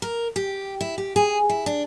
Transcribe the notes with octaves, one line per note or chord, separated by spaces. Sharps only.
A#4
G4
E4
G4
G#4
E4
D4